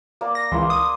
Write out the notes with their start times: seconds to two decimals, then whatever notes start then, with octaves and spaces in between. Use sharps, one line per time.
0.21 A#3 D5 D6
0.35 A#6
0.52 C#2 E3 A#3 C6
0.70 D#6